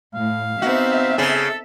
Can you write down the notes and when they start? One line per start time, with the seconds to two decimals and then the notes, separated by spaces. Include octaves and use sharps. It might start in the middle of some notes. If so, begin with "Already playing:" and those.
0.14 A2 F5
0.62 B3 C4 D#4 F#4 E5
1.18 C#3 G#4 A4